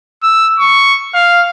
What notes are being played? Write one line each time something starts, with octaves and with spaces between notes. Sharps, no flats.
E6
C#6
F5